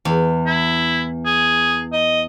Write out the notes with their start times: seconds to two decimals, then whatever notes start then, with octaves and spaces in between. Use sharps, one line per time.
0.05 E2
0.46 E4
1.26 G#4
1.93 D#5